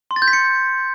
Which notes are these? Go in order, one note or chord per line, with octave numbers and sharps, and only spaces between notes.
C6
A6
G6
B6
C#7